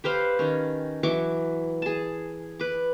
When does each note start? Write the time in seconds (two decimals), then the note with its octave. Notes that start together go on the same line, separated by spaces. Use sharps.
0.04 G4 B4 C5 F5
0.39 D#3 C#4
1.03 E3 F#3 C#6 D6
1.82 G#4 A5
2.59 B4 D6